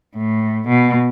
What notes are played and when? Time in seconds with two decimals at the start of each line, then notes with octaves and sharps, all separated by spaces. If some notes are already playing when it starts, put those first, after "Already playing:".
0.17 A2
0.67 B2